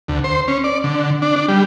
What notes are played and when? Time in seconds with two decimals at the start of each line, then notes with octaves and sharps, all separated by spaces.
0.08 D2
0.24 C5
0.48 C#4
0.64 D5
0.84 D3
1.22 D4
1.36 D4
1.48 G3